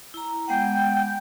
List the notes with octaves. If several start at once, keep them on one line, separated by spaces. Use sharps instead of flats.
E4 A#5
G#3 B3 F#5 G5